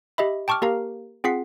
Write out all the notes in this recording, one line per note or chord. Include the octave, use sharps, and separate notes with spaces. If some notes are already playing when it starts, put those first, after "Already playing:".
G4 D#5 E5 B5
G5 A5 C#6 D6 F6
A#3 G4 A#4 F5 A#5
C4 F4 G#4 F#5 B6 C7